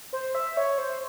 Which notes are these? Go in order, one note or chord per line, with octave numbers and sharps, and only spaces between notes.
C5
E5
C#5
C5